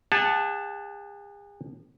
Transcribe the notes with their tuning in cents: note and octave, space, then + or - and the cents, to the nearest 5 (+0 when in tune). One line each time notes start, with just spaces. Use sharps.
G#4 -40 F#5 +0 A5 +0